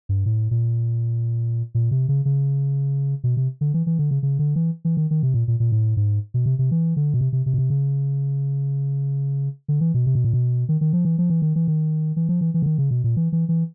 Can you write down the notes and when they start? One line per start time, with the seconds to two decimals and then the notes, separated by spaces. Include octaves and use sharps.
0.09 G2
0.26 A2
0.51 A#2
1.75 A#2
1.91 C3
2.09 C#3
2.25 C#3
3.24 B2
3.37 C3
3.61 D3
3.74 E3
3.87 E3
3.99 D3
4.11 C#3
4.23 C#3
4.39 D3
4.56 E3
4.85 E3
4.97 D#3
5.11 D#3
5.23 C3
5.34 A#2
5.48 A#2
5.60 A#2
5.72 A2
5.97 G#2
6.34 B2
6.46 C3
6.59 C3
6.71 E3
6.97 D3
7.14 B2
7.21 C3
7.33 C3
7.46 C3
7.54 B2
7.58 C3
7.70 C#3
9.68 D3
9.81 E3
9.94 B2
10.06 C3
10.15 B2
10.24 A#2
10.33 B2
10.69 D#3
10.81 D#3
10.93 F3
11.05 E3
11.18 F3
11.30 E3
11.42 D#3
11.56 E3
11.68 D#3
12.16 E3
12.29 F3
12.41 E3
12.54 E3
12.62 D3
12.66 D#3
12.78 C#3
12.91 B2
13.04 A#2
13.17 E3
13.32 E3
13.49 E3